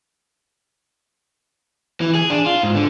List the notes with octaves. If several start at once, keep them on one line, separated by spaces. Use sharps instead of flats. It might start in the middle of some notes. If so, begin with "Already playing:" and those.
E3
G#4
D4
F4
G#2
D3